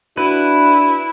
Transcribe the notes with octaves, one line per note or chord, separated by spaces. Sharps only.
D4 E4 F#4 B4